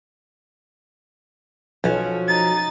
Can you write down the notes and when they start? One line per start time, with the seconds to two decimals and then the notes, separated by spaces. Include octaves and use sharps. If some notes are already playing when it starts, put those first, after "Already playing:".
1.84 B1 F3 A3 C#4 F#4
2.27 D#4 A6